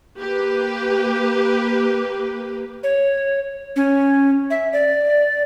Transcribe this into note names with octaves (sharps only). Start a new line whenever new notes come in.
A#3 G4 B4
C#5
C#4
E5
D5